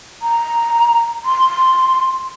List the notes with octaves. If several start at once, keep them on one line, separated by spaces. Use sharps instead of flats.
A#5
C6